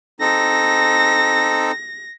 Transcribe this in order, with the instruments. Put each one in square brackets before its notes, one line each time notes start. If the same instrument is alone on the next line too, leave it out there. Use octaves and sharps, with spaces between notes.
[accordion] C4 D#4 A4 [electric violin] A#6